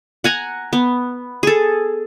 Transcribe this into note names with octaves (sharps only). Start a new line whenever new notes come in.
F#5 G#5 A#5
B3
G#4 A4